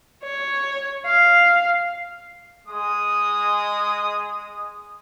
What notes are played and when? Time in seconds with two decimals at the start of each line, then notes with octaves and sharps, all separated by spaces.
0.24 C#5
1.06 F5
2.66 G#3 D#6